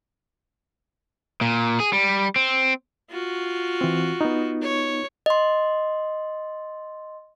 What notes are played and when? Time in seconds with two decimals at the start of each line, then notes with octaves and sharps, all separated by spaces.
1.41 A#2
1.80 G#4
1.93 G3
2.36 C4
3.10 F4 F#4
3.81 E3 C4
4.21 B3 D#4
4.62 C#5
5.26 D#5 C6